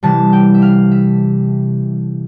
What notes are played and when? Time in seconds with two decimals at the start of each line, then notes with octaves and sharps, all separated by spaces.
0.03 C3 E3 G3 A5
0.33 G5
0.54 E5
0.62 F5
0.91 E5